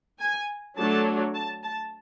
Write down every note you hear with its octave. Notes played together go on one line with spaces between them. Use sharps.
G#5
F#3 A3 D4 A5
A5
A5